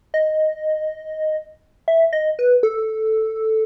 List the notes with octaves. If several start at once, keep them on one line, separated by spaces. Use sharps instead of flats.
D#5
E5
D#5
B4
A4